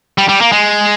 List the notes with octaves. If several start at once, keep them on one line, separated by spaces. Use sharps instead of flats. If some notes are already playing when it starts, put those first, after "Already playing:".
G3
G3
A#3
G#3